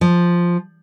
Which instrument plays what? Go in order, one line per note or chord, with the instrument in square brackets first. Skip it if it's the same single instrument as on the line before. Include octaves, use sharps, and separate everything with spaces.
[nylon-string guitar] F3